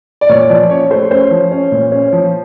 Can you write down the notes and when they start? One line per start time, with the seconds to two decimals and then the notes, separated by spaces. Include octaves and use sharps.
0.21 D5
0.29 A#2 C#5
0.49 F3 D5
0.70 C#4 C#5
0.91 A3 C5
1.11 C#4 C5
1.31 F3
1.52 C#4
1.72 A#2
1.92 C#4
2.13 F3